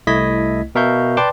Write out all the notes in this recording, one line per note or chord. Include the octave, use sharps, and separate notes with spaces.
C2 A3 E4 D#5 G#6 B6
B2 A#4 E5 F5 C#6 G6
B4 D5 G5 A5 C6 D6